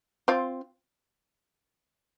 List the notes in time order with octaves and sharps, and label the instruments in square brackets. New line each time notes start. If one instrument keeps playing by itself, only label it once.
[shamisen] C4 F4